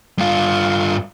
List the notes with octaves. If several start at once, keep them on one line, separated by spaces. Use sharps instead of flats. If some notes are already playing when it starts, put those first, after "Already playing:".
G2 F4